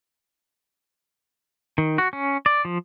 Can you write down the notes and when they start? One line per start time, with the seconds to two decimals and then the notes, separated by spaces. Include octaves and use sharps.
1.78 D#3
1.98 F#4
2.13 C#4
2.46 D5
2.65 F3